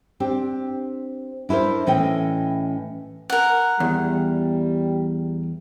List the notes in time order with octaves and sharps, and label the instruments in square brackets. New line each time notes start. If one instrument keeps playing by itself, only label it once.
[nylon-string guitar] C4 D4 G4
D4 E4 G#4 A#4 C5
A2 E3 C#4 D#5 G5
[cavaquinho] A#4 F#5
[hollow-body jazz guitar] E2 [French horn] G3